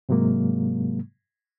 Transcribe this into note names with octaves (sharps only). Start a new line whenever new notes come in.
G#2 C3 F#3 G#3 A#3